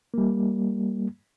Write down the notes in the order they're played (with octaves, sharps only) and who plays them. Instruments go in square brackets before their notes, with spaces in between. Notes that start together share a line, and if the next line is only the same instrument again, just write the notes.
[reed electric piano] G3 A#3